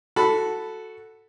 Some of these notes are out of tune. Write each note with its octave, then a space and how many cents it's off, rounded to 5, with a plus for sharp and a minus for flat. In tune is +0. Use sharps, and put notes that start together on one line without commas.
F#4 +0 A4 +0 B5 +0